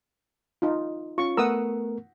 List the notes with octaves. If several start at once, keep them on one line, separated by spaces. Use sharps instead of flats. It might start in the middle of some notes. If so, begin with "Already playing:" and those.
D#4 F4
C#4 F4 C#6
A3 B3 A#4 F#5 D#6 E6